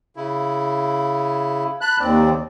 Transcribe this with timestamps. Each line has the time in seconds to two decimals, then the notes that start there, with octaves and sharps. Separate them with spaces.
0.16 C#3 E4
1.81 A5 B5 F#6
2.00 D#2 C4 D5